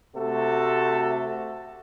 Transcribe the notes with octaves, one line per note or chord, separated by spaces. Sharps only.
C3 A3 F#4 A4